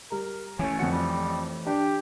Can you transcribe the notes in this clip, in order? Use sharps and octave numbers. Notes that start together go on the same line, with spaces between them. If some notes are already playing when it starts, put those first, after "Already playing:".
G3 A#4
E3 A3 C#4
F2 F#4 C#7
G3
D4 G4